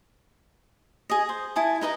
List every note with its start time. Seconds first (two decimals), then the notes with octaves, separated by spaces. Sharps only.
1.10 G#4 D#5
1.29 C5
1.56 E4 G#5 A5 D#6
1.81 D#4 B4 D#5 A#5